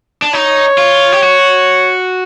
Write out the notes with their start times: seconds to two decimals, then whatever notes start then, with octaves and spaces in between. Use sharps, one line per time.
0.22 D4
0.33 D#4 C#5
0.78 F4
1.12 G4
1.23 F#4